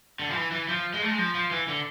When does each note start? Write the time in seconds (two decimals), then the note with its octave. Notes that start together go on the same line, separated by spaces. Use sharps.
0.19 D3
0.30 F3
0.35 E3
0.52 E3
0.69 F3
0.94 G#3
1.02 A3
1.11 G#3
1.18 F3
1.35 F3
1.51 E3
1.68 D3